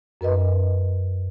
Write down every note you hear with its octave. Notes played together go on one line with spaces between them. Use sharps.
F#2 A#4 B4 D#5